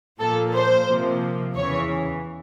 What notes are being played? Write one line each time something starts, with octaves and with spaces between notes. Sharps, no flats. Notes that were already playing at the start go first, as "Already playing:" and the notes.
A#2 F3 A#3 A4
C5
C3 F3 A#3
E2 C#3 E3 C#5